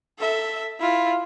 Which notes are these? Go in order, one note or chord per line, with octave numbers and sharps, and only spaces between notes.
A4 E5
E4 F4